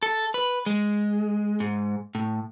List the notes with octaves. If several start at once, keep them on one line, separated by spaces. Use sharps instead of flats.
A4
B4
G#3
G#2
A2